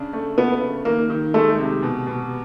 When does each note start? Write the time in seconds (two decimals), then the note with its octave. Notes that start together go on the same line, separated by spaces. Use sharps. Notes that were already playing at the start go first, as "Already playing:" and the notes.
Already playing: C#3 D4
0.13 A3
0.37 C#3 B3
0.61 C#3
0.85 D#3 A#3
1.10 D#3
1.34 G#3 A3
1.58 C3
1.83 B2
2.07 B2